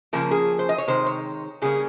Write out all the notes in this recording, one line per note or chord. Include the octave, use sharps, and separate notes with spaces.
C#3 F3 A#3 C#4 A#4
G#4
C5
D#5
C#5
C3 D#3 G#3 C5
C#5
C#3 G3 A#3 C#4 G#4